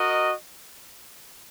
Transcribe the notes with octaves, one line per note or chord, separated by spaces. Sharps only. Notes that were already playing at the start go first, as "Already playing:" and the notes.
Already playing: F#4 A#4 D#5